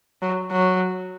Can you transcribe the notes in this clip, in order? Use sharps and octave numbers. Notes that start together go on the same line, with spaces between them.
F#3
F#3